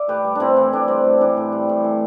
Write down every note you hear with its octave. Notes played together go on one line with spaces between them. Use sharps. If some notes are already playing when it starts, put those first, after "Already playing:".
Already playing: D5 E5
A2 G4 B4
G3
A2 C4 D4 E4
E3
A2 D4
G3 C4
A2
E3 D4
A2
G3
A2
E3